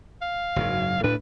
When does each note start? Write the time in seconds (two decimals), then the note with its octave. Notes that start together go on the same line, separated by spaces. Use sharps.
0.22 F5
0.56 F#1 G#2 F#3
1.03 D2 A2 D4 B4